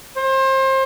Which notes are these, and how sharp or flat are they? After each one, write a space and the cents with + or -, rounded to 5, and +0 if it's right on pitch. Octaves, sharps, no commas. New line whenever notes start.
C5 +30